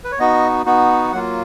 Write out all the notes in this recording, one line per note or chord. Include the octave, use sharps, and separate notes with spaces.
B4
C#5
B3 D#4 F#4 D#5
B3 D#4 F#4
F#3 A#3 F4 F#5